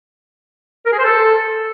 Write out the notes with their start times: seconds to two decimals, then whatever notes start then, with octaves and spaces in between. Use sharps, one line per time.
0.86 A#4
0.92 G#4
0.98 C5
1.05 A4